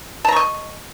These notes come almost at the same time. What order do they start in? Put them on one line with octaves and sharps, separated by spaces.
A5 A#5 C#6 D#5